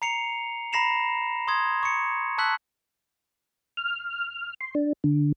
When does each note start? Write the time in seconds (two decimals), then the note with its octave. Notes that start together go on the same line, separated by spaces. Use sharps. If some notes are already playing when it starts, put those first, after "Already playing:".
0.02 A#5 C7 C#7 F7
0.73 A#5 B5 A#6 C7 E7 F7
1.48 C6 D#6 G#6
1.83 C#6 C#7
2.38 A5 C#6 E6 F#6 B6 F#7
3.77 F6
4.61 C6
4.75 D4
5.04 D3